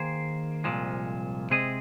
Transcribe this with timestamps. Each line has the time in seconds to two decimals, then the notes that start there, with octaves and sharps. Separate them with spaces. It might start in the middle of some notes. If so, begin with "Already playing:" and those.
Already playing: D#3 A#3 G#4 C5
0.64 C2 A#2 F3 G#3
1.50 C3 G#3 C4 G#4 D#5